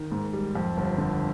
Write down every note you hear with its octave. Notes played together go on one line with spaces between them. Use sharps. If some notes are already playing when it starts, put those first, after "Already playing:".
Already playing: D#3
G#2
G3
F2
G1
D3